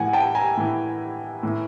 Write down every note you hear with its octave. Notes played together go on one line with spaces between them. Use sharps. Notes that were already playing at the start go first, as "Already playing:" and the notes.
Already playing: A2 E3 F#5 G#5
G5 A5
G#5 A#5
A2 E3
A2 E3